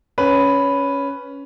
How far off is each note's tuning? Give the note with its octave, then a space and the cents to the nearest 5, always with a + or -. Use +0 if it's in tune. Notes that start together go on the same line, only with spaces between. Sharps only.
C#4 +10 B4 +0